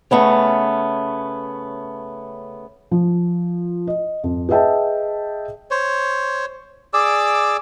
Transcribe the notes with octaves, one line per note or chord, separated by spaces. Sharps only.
C#3 A3 B3 C#4
F3
D#5
F2
G#4 B4 D#5 E5 G5 A5
C5 C#5
G#4 D5 D6 E6